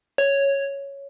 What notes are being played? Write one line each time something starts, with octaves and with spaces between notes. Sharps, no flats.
C#5